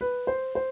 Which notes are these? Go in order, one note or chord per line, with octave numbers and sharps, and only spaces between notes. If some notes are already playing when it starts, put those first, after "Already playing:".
B4
C5
C5